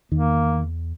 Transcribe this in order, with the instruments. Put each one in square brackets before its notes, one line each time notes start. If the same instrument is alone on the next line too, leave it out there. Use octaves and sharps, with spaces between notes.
[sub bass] E2 [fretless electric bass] D#3 [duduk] A#3